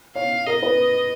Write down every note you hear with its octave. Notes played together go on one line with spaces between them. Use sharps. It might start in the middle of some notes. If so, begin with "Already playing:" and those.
C#5 F5
A#4 D#5
B4